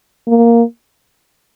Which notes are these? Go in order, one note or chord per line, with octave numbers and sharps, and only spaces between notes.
A#3